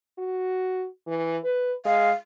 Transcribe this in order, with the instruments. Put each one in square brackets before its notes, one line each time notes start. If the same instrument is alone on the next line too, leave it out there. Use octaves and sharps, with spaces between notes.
[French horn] F#4
E3
B4
[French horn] G#3 [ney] F5